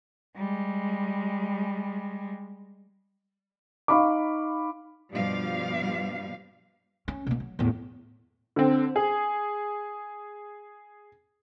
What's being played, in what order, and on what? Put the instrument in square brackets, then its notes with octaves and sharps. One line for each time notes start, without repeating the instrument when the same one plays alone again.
[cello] G3 G#3
[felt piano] D#4 F5 B5 C#6 D6
[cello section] G2 B2 F3 G3 F5
[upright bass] C#4
B2 A#3
F#3
E2 A2
[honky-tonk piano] D3 C4
G#4